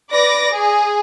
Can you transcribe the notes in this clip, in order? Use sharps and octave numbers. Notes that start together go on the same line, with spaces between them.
B4 D5 D6 A#6
G#4